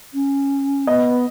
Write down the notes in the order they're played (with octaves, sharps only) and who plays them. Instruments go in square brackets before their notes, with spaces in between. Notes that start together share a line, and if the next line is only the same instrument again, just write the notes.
[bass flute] C#4
[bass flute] B3 [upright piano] D#5